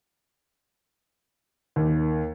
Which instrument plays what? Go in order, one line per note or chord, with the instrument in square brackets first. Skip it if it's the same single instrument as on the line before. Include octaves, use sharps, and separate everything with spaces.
[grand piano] D#2